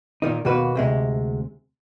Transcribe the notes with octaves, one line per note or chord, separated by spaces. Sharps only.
A#2 D#3 D#4
D#2 B2 A#3 F#4 B4
D2 C3 G#3